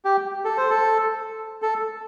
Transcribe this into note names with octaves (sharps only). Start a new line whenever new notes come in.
G4
A4
C5
A4
A4